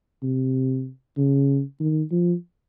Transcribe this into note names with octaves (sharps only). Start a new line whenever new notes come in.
C3
C#3
D#3
F3